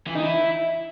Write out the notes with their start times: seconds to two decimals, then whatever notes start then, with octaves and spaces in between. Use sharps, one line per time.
0.07 E3
0.15 D#4
0.23 E4